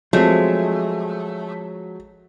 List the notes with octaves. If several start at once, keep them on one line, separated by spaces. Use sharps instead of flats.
F3 F#3 G#3 A3 C4